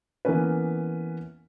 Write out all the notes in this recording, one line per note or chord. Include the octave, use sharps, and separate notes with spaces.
E3 A#3 B3 C#4 B4